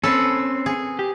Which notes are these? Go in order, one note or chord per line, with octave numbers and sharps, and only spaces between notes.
C4 C#4 A4 B4
G#4
G4